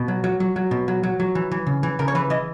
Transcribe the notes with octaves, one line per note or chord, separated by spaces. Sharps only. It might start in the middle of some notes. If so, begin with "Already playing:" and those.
Already playing: B2
F#3
F#3
F#3
F#3
B2
F#3
F#3
F#3
E3
E3
C#3
E3
C#3 A#4
C#5
E3 B4
E3 D#5